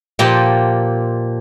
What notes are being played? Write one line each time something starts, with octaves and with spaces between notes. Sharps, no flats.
A#2 F3 G4 A5